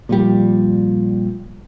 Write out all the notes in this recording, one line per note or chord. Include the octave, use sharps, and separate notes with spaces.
A#2 F3 G3